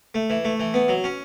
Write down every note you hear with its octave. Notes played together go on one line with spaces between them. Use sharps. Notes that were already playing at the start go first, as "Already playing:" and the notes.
A3
E3
A3
E3
B3
F#3
C#4